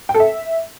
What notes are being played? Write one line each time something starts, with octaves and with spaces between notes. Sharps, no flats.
G5
A4
E5